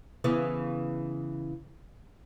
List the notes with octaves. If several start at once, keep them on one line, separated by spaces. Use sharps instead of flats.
C#3 E3 B3